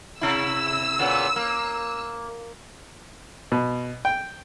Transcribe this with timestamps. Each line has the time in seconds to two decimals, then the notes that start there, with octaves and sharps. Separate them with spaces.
0.21 C3 E4 E6
0.99 A#2 C#3 B3
1.36 A#3
3.52 B2
4.05 G5